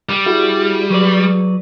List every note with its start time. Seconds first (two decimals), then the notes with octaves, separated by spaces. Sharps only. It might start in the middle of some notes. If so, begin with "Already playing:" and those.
0.09 G3
0.26 E4 F#4 G#4
0.90 F#3 B4 D5